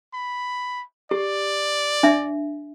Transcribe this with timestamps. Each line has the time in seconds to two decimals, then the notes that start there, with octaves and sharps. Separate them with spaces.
0.14 B5
1.11 G4 D5
2.03 D4 E5